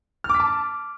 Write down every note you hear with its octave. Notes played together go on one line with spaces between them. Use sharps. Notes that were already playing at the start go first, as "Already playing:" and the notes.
F6
D6
B6
A5